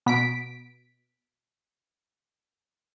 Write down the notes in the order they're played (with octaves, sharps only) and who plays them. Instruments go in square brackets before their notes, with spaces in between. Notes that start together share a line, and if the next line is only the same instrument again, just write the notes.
[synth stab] B2 B6 D7